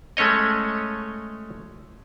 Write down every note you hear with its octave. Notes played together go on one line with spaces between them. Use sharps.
G#3 A3 C#4 C#5 D#5